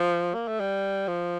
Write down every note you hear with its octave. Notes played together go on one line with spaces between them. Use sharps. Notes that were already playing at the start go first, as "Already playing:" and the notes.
Already playing: F3
A#3
A3
G3
F3